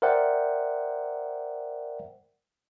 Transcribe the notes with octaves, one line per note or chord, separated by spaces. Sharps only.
A#4 C5 D5 E5 F#5 G5